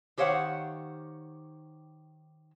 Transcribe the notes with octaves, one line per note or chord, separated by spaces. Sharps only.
D#3 G4 C5 C#5 F5 F#5